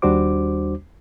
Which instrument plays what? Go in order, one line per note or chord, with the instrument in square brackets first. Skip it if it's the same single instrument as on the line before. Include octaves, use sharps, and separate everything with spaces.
[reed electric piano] D#2 G3 D4 F#4 C5 D6